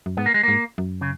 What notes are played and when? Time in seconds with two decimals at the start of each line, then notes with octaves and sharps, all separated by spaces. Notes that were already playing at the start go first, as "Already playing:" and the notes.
0.06 F#2
0.17 G#2 B3
0.26 A#3
0.34 G#3
0.43 G#2 A#3
0.78 F#2
1.01 C#3